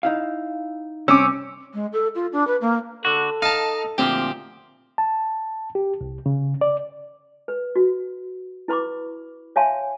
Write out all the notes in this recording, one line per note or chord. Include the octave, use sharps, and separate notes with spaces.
D#4 E4 F5
C3 G3 C4 C#4 D6 E6
G#3
A4
F4
D4
B4
A#3
D3 F#4 A4
D#4 F5 A5
D2 A#2 F3 C4 G4
A5
G4
C2
C#3
D5
B4
F#4
E4 B4 B5 C#6 D6
C#5 E5 F5 G#5 A5 C6